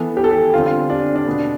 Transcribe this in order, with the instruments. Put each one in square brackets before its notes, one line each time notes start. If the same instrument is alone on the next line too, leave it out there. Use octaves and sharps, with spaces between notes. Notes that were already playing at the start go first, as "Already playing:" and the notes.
Already playing: [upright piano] E3 B3 A4
G4
A4
G4
D3 G3 C4 F4
F4
D4
D4
B2 B3